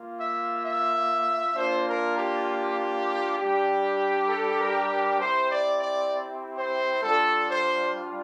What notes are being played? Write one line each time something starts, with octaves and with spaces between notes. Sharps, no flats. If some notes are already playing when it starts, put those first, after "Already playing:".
Already playing: A#3 F4
E5
E5
A#3 D4 F4 C5
A#4
G4
G3 D4 G4
A4
A#4
A#4
C4 E4 G4 C5
D5
D5
C5
G3 D4 F4 A4
C5